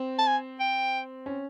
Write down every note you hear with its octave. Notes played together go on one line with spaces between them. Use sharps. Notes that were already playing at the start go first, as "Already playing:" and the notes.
Already playing: C4
A5
G#5
G5
C#4